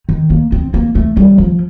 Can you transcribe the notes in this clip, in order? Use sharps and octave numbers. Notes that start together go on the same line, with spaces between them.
D#3
A#3
C4
A#3
A3
G3
F3